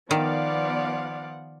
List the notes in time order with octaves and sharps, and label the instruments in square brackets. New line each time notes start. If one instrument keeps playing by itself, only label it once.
[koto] D#3 [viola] F3 F#5 [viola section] B3 D5 F5